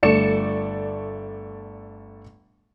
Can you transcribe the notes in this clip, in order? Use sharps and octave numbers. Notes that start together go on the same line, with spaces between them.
G1 A3 D5 C#7 E7